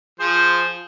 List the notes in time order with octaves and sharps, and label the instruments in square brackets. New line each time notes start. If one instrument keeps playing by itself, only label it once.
[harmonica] F3 G#4 C5